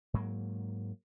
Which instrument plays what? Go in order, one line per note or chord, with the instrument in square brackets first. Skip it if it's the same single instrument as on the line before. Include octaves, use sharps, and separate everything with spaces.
[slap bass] G#2 F#3 A#3